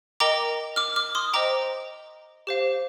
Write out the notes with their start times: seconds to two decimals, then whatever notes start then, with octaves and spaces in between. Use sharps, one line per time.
0.20 A#4 D#5 G5 A#5 D6
0.76 D6 F6
0.96 D6 F6
1.15 C6 D#6
1.33 C5 D#5 G5 A#5 D6
2.47 G4 C5 F5